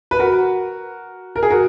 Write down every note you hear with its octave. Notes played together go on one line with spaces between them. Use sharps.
B4
F#4 A#4
A#4
G#4
F#4 A#4